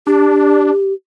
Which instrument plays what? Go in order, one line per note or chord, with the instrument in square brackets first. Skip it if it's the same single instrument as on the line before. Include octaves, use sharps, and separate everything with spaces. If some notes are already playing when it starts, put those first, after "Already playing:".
[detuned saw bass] D4 [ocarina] G4